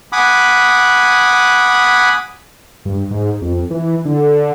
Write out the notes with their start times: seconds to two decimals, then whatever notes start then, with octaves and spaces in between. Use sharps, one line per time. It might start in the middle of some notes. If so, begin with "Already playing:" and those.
0.13 F#5 G#5 B5 D6 D#6
2.85 G2
3.11 G#2
3.42 F2
3.71 E3
4.05 D3